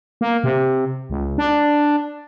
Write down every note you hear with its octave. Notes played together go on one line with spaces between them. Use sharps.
A#3
C3
C#2
D4